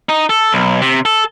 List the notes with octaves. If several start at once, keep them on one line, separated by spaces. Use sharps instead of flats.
D#4
A4
B1
C3
A4